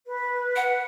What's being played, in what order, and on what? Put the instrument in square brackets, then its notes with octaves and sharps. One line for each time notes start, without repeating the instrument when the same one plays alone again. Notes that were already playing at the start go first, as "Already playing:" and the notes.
[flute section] B4
[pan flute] F#5